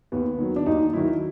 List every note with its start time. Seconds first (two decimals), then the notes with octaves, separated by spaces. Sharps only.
0.12 D#2 B3
0.38 D#3 F#3
0.56 D4
0.66 D#2 D#4
0.93 D#3 F#3 E4